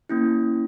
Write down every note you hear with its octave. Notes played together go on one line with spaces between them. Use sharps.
A#3 C#4 E4